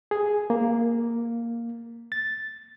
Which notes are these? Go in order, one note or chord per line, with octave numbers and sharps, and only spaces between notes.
G#4
A#3
A6